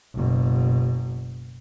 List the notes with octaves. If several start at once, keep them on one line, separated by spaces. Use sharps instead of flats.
F#1 B2